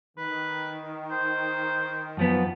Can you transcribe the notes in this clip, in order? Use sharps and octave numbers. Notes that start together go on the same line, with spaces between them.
D#3 B4
C5
F#2 F3 B3